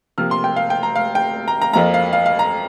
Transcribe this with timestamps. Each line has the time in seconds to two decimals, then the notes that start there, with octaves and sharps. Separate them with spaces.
0.18 C3 F3 A#3 F6
0.31 C6
0.44 G5
0.56 F5
0.70 G5
0.83 A#5
0.96 F5
1.15 G5
1.48 A#5
1.62 A#5
1.73 F2 F3 A#3 A#5
1.94 F5
2.13 F5
2.26 F5
2.39 A#5